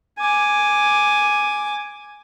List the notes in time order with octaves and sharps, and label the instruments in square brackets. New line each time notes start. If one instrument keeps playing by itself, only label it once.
[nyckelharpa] G#5 D6